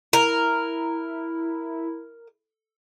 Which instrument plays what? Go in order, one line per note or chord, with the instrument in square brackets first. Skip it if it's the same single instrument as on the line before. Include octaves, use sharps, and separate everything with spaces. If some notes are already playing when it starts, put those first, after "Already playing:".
[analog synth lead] E4 [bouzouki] A#4